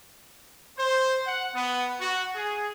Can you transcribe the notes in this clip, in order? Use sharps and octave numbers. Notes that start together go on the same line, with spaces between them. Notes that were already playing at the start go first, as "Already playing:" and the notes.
C5
F#5
B3
F#4
G#4